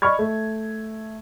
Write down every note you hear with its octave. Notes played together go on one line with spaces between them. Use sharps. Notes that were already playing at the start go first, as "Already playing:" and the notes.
D5 D#5 B5 C#6 F6 G#6
A3